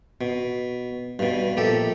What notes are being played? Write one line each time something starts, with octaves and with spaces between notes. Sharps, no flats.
B2
G2 B2
A#1 G4 A4